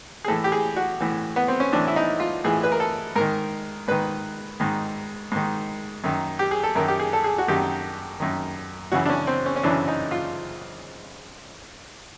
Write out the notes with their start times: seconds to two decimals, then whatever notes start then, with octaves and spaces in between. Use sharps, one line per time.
0.25 G#4
0.28 A2 E3 A4
0.44 G4
0.52 G#4
0.76 F#4
1.01 A2 E3
1.36 B3
1.48 C4
1.60 C#4
1.72 A2 E3 D4
1.88 E4
1.96 D#4
2.20 F4
2.44 A2 E3 G#4
2.64 B4
2.72 A#4
2.80 A4
3.16 G#2 A#4
3.21 D#3
3.88 G#2 D#3 B4
4.60 G#2 D#3
5.32 G#2 D#3
6.04 F#2 D#3
6.39 G4
6.51 G#4
6.63 A4
6.75 F#2 D#3 A#4
6.88 G4
7.00 G#4
7.13 A4
7.24 G#4
7.38 F#4
7.48 F#2 D#3 G4
8.20 F#2 D#3
8.92 F#2 C#3 E3 F#4
9.05 D4
9.10 C#4
9.27 C4
9.46 C#4
9.56 C#4
9.63 F#2 C#3 E3 D4
9.88 D#4
10.11 F4